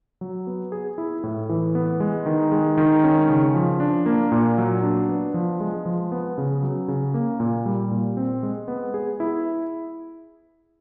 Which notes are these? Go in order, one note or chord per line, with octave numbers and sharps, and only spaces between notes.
F#3
B3
G#4
E4
A2
E3
B3
G#3
D#3
G#3
D#3
C#4
C#3
F3
D4
A#3
A#2
F#3
D4
B3
F3
G#3
F3
B3
C#3
F#3
C#3
A#3
A#2
G3
A#2
C4
G#3
B3
G#4
E4